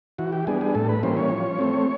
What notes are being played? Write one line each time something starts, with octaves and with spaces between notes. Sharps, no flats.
E3 F#4
G4
G3 B3 D4 G#4
G#4
A2 A4
B4
E3 G3 A#3 C#4 C5
C#5
F3
A3 C4